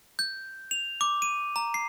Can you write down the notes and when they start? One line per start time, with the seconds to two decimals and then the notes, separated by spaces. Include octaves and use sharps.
0.19 G6
0.71 F7
1.01 D6
1.22 D#7
1.56 A#5
1.74 C7